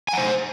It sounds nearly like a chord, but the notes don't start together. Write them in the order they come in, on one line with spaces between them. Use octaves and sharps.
G#5 F#5 C5